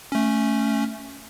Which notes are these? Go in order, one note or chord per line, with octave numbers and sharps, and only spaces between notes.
A3 C#4